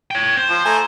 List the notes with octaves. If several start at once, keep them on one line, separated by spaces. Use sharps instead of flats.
C#5 G5
C5
F3
A3 G#5 A#5